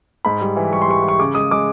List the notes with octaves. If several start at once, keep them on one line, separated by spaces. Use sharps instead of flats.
G#2 B5
G3
E3
G3 C#6
C6
G3 C#6
E3
C#6
C#3 D6
G#3 D#6
G#3 D6